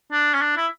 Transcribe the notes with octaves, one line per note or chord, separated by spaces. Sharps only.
D4
C#4
D4
E4